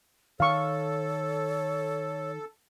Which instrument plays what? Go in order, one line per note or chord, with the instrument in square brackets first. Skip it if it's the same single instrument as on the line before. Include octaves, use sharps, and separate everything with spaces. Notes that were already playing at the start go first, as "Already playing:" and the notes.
[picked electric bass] D#3 [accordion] A4 [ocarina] C#5 [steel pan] F5 C#6